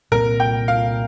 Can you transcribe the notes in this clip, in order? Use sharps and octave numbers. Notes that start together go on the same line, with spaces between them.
C2 A#2 G3 C4 A#4
G5
F5